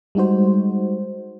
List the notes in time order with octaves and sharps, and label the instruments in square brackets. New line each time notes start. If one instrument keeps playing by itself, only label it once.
[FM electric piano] G3 G#3 D#4 F#4 C5